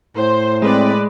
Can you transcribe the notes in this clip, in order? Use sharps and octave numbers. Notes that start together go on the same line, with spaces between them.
A2 C5
G#3 C4 B4 D5